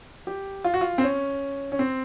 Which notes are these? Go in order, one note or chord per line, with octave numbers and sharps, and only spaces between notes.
G4
F4
F#4
F4
C4
C#4
C#4
C4